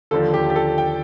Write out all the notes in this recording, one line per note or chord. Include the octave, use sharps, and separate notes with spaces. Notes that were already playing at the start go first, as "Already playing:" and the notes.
D#2 D3 F3 A4
G4
G4
A4
G5